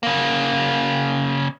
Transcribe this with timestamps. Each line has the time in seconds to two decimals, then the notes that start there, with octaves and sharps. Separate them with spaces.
0.03 C#3 A#3